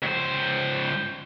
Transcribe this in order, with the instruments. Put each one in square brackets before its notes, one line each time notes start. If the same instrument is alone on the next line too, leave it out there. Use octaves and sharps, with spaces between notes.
[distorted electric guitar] C#2 C5